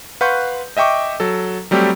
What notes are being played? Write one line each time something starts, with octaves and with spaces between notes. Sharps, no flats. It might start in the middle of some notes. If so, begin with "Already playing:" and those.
B4 F5 F#5 C6 C#6 G6
D#5 E5 G5 C#6 D6
F#3 A4
F#3 G3 A3 C4 G4